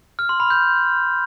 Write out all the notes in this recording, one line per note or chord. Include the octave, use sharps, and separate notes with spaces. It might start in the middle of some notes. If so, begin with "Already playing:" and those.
F6
C6
B5
G6